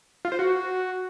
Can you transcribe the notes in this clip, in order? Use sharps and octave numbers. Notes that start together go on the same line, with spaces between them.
F4
C5
F#4